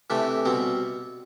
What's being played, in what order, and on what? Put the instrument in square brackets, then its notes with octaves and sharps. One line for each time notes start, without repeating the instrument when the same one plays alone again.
[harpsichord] C3 E3 A3 D4 G4
B2 G3 C4